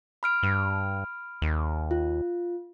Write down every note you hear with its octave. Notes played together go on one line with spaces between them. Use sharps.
B5 F6 D7
G2
D#2
F4